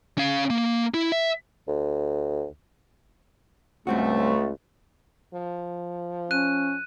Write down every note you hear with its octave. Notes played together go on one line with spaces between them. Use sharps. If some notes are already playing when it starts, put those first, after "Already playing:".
C#4 F5
A#3
E4
E5
D2
C#2 G2 A3 C4 F#4
F3
C#4 F#6 D#7